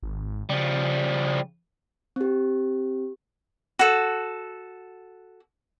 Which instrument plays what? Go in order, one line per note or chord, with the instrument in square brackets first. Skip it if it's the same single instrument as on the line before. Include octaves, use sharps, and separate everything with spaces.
[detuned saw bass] G#1
[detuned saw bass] C#3 [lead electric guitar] F3 G3
[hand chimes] C4 G4
[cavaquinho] F#4 A4